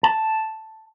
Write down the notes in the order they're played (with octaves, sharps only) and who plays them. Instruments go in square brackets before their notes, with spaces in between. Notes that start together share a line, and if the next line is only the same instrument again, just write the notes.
[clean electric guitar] A5